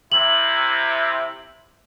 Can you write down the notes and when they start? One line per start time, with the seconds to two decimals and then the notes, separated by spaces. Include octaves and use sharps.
0.12 C3 E4 F#7